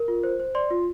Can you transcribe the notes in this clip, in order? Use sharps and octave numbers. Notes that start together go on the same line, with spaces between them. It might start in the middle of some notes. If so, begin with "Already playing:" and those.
Already playing: A#4
F4
C5
C5
D5 C6
F4